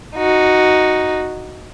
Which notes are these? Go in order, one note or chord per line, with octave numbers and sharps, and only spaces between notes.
D#4 F#4